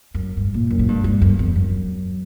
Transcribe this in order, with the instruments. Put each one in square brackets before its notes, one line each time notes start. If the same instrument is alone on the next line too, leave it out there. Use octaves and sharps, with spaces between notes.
[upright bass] F#2
G2
A#2
F#2
A#2
G2
G2
F#2
E2
F#2